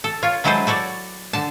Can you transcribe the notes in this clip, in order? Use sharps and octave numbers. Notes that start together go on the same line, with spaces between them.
A4
F4 C#5
F#3 G#3 E4 A4 B4 C5
F#4 A4 C#5 D5
D3 A5